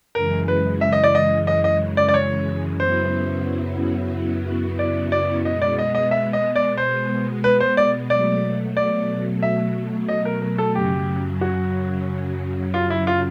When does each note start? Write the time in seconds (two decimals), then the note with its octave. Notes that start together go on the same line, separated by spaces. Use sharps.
0.15 F#2 C#3 E3 G#3 A#4
0.48 B4
0.81 E5
0.92 D#5
1.04 D5
1.15 D#5
1.47 D#5
1.64 D#5
1.97 D5
2.09 D5
2.14 C#5
2.80 F#2 C#3 F#3 B3 E4 C5
4.79 D5
5.12 D5
5.45 B2 G#3 B3 D#5
5.62 D5
5.79 D#5
5.95 D#5
6.11 E5
6.33 D#5
6.56 D5
6.78 C5
7.44 B4
7.60 C5
7.77 D5
8.10 B2 F#3 A3 D5
8.77 D5
9.43 E5
10.08 D#5
10.25 A#4
10.42 A#4
10.58 A4
10.75 F#2 C#3 F#3 G4
11.41 F#4
12.74 F4
12.90 E4
13.07 F4